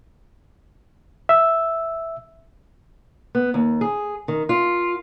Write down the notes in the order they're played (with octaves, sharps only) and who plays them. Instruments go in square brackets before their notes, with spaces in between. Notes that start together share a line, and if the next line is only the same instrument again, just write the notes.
[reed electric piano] E5 E6
[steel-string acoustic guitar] B3
D#2
G#4
D#3
F4